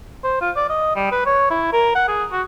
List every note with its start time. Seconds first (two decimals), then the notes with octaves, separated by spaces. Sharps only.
0.24 C5
0.42 F4
0.56 D5
0.69 D#5
0.96 G3
1.12 B4
1.26 C#5
1.50 E4
1.73 A#4
1.95 F#5
2.08 G#4
2.32 F#4